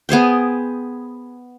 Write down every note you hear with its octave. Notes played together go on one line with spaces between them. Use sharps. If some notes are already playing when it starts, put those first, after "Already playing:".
B3 G#4 C5 G5